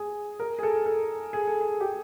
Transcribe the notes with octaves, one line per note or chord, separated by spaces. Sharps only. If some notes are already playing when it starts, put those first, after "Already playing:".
Already playing: G#4
A#4
G#4
A4
A4
G#4
A4
G#4
G4